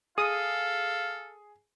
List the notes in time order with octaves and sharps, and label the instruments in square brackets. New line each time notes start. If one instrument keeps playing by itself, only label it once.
[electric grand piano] G#4 [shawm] A4 [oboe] F5 [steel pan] D#6